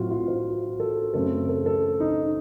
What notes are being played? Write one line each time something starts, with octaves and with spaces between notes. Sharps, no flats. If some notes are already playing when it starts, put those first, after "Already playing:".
Already playing: A2 F#3 C4 F4 F#4
F4
C5
A4
F#2 C#3 A3 C4 A4
A4
A4
D#4